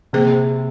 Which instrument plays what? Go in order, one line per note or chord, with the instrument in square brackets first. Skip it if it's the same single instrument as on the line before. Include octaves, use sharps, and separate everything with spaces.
[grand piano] C3 [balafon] A#3 G#4 C5